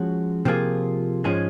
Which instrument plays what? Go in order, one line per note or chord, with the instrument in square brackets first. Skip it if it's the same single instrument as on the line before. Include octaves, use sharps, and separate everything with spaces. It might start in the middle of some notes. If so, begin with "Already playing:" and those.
Already playing: [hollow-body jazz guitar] F3 G#3 C#4 F#4
C3 F3 A#3 F4 G#4
G#2 F3 G#3 C#4 G#4